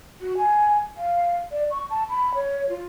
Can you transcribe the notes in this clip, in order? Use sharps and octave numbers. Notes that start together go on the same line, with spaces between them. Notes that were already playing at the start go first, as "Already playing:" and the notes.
F#4
G#5
F5
D5
C#6
A5
B5
C#5
F4